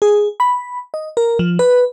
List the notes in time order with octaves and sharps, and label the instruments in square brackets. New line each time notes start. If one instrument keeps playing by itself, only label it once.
[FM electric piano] G#4
B5
D#5
A#4
F3
B4